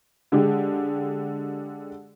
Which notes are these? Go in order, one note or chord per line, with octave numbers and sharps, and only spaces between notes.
D3 G#3 G4